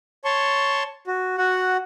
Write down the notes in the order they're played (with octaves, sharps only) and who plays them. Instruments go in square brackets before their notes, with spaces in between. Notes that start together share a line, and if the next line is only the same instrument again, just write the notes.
[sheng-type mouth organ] C#5 A5 C6 C#6
F#4
F#4 F#5